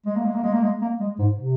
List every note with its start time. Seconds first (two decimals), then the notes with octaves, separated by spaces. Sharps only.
0.06 G#3
0.16 A#3
0.25 G#3
0.35 A#3
0.44 G#3
0.53 A#3
0.63 G#3
0.82 A#3
1.00 G#3
1.19 G#2
1.38 C3